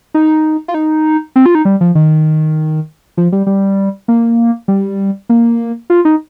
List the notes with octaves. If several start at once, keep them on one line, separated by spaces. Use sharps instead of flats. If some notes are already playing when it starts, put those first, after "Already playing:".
D#4
F4
D#4
C4
F4
D#4
G3
F3
D#3
F3
G3
G3
A#3
G3
A#3
F4
D#4